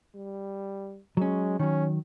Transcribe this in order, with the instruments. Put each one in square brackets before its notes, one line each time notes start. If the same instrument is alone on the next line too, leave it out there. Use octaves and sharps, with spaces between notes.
[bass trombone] G3
[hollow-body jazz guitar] F#3 C#4 [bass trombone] G#3
[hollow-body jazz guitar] D#3 F#3 [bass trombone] C#4